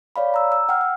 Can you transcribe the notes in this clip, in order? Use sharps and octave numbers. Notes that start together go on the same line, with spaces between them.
C#5 D5 F5 B5
A#5 E6
E6
F#5 G5 F6
F#5